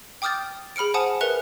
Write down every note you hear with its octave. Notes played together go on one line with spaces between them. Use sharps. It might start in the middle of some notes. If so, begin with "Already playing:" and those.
G5 D6 D#6 F6 G6 A6
G#4 B5 F6 C#7 D7
C5 F#5 G#5 A5 D#6
A#4 B4 E5 F#6 C#7 F7